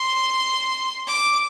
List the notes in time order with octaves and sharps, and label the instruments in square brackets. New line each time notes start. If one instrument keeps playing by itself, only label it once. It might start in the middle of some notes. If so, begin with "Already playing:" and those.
Already playing: [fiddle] C6
D6